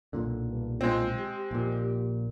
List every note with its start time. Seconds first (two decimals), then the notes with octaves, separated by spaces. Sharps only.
0.13 B1 A#2 D3
0.49 G2
0.81 G#3 C4 F4
1.19 G4
1.51 A#1 A#2